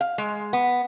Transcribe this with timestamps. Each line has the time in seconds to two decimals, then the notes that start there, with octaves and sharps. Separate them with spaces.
0.01 F5
0.18 G#3
0.53 B3